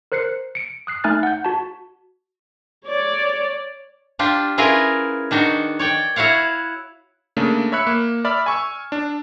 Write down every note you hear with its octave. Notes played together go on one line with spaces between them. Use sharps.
A#4 C5 F#6 C7 C#7
C#7 D7
D#6 F#6 C7
A3 D#4 G#5 F6 F#6 A6
F#5 G6
F#4 A5
C#5 D5
D4 F4 G4
C#4 E4 F4 G#4 A#4 B4
D#3 D4 D#4 F#4
C#5 D5 G5
E4 F#4 C#5 F5 F#5
C#3 A3 A#3 D4
C#5 E5 B5 F#6 C#7
A#3
D5 E5 B5 F6
G#5 C#6 E6
D4